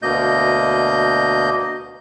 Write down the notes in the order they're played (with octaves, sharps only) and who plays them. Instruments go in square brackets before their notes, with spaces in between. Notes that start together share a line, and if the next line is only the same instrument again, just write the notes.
[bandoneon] D2 B2 A#3 D#5 G6